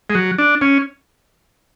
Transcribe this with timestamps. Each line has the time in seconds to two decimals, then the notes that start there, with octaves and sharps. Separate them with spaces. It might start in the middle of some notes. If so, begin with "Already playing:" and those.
0.10 G#3
0.15 F#3
0.38 D4
0.61 C#4